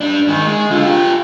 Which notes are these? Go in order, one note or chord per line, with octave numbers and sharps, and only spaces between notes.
G3 D4
G#2 D#3
G#3
D3 F4
F4 G4